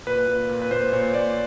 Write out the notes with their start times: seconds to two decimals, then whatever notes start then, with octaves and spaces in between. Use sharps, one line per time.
0.07 A#2 B4
0.28 A#2
0.49 A#2
0.62 B4
0.71 A#2 C5
0.92 A#2 C#5
1.13 A#2 D5